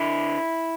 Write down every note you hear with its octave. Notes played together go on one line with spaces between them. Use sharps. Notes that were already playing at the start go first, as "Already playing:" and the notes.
Already playing: D3 E4